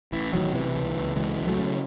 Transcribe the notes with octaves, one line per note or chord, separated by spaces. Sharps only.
A1 E3
A1 D#3 F#3
C3 E3
C#2
C#2
C#2 E3 G#3
C#2
F#3 A3
C#3